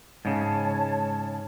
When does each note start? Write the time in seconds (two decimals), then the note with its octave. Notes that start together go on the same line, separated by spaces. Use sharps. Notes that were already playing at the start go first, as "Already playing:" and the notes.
0.25 G#2 C#3 C#5 A5